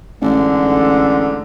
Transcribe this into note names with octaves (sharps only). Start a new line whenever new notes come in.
A1 G#2 D3